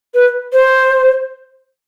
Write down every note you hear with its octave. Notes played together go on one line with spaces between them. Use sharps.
B4
C5